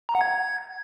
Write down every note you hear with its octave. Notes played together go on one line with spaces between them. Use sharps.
A#5
F#5
G#6